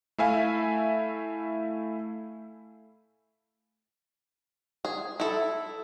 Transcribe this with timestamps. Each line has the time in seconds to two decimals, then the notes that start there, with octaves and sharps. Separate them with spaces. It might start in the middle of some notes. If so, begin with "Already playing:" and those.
0.18 A3 E4 E5 F5 G#5
4.85 G#4
5.20 E4 A4